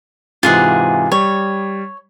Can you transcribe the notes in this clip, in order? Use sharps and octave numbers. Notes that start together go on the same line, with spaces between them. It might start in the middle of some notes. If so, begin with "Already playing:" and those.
G#2 C3 E3 F4 G#4 F#5
G3 C#5